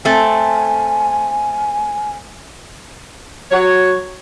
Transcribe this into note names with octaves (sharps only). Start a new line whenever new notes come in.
A3 C4 G#5
F#3 F#4 C#5